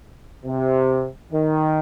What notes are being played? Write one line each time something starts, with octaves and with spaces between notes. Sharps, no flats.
C3
D#3